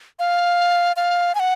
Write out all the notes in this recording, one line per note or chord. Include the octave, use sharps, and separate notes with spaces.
F5
F5
G#5
F#5